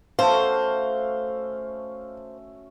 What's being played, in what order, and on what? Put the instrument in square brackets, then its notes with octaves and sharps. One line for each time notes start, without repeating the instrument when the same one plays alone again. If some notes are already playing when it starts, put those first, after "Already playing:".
[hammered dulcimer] A3 C#4 F#4 [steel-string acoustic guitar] C5 [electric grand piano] F5